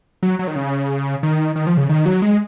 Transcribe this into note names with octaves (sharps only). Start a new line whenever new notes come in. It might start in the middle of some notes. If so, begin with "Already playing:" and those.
F#3
F#3
D#3
C#3
D#3
D#3
F3
C#3
D#3
F#3
G#3